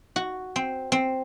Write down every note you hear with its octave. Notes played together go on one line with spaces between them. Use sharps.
F#4
C4
C4